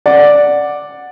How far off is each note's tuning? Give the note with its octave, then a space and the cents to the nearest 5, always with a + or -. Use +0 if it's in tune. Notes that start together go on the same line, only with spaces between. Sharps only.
D5 +0 F#5 -10